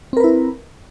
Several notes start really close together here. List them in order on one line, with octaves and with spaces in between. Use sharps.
C4 A#4 B4 E4